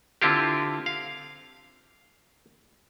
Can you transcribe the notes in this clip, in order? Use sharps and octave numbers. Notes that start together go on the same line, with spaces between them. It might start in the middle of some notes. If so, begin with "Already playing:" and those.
D3 C4 E4 F4 G4
F5